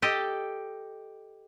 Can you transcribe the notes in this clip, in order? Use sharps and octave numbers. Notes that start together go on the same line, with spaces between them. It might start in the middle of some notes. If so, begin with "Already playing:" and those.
G4 A4 D#5